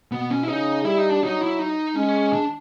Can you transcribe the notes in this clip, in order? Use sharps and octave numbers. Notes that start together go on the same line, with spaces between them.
B2 B3
C#4
E4
C#3 D#4
G3 E4
D#4
D4
F#3 D#4
E4
D#4
G#3 C#4
D4